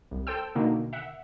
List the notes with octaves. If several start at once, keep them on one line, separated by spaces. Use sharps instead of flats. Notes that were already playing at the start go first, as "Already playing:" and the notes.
C2
A4 C5 G5 E6
B2 D3 D#3 A#3
E5 F#5